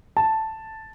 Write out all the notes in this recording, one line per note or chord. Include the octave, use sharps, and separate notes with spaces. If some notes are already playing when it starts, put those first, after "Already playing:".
A5